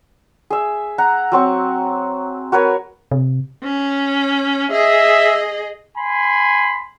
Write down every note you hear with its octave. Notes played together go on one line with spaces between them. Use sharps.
G#4 E5
F#5 A#5
F#3 C4 C#6
F#4 A#4 B4 C#5
C3
C#4
G#4 D#5 E5
G#5 B5 C6